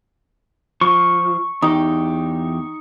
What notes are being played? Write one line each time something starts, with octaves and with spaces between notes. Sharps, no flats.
F3 C#6
E2 D#4 G4